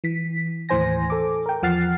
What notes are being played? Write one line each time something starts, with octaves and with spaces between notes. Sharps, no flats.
E3 B6
D#2 A2 E3 C5 G#5 A#6
A4 D6
A#4 G5
E2 F3 F#5 F6 A6 C7